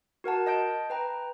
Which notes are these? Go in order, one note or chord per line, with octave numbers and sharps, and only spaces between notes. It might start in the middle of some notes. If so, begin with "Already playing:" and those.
F#4 A#4 F#5 A5
D#5 A5 G6 D7
B4 G5 A#5